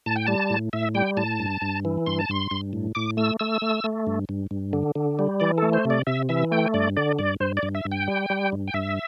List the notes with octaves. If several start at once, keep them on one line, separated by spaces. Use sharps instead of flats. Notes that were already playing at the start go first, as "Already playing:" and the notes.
A2 A5
G5
G3 A5
A2
A2 E5
G3 G5
A2 A5
G2
G2
E3
G2 C6
A5
G2 C6
G2
A2
A2 D6
A3 E6
A3 E6
A3
A3
G2
G2
G2
D3
D3
G3
E3 D5
A3 A4
C5
C3
D5
C3 E5
E3 E5
A3 G5
G2 D5
D3 D5
G2 D5
G2 C5
D5
G2
E5
G2
G5
G3
G3
G2
G5
G2 E5